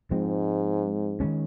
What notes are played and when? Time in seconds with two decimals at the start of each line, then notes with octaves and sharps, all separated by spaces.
0.11 G#2 F3 G#3 C4
1.20 D#3 G#3 C#4